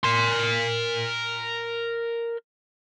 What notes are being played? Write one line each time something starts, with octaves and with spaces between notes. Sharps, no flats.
A#4 C6